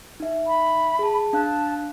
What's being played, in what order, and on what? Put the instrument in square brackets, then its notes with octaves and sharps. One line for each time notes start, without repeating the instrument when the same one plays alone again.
[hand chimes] D#4 E5
[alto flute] B5
[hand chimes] G#4 A5
[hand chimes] D4 F5 F#6 [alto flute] A5